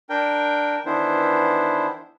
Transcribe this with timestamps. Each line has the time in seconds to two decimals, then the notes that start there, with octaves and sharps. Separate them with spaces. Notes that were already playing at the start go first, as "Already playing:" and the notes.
0.10 D4 A#4 G5
0.86 D#3 E3 B3 D4 E4 C5